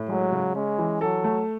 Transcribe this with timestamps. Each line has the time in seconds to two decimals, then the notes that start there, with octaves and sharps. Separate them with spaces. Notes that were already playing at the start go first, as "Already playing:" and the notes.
Already playing: A2
0.09 F#3 G#3
0.32 C#3
0.55 G#3 C#4
0.78 E3
1.01 F#3 A4
1.24 A3